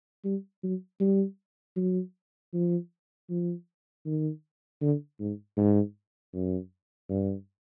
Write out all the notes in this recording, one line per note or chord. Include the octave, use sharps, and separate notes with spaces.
G3
F#3
G3
F#3
F3
F3
D#3
D3
G#2
G#2
F#2
G2